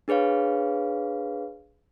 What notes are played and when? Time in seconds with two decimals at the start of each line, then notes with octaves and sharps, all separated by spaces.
0.08 D4 G#4 B4 C#5 F5